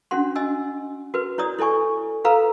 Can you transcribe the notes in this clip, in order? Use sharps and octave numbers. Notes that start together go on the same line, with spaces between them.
C#4 D4 F#4 F#5 C6
D#5 G#5 E6
F#4 A#4 B4
E4 C#5 D5 D#6
E4 A4 D5 G#5 C#6
F4 A4 B4 F5 A#5 E6